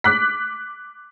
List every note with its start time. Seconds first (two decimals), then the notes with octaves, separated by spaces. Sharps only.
0.04 D6 F#6 B6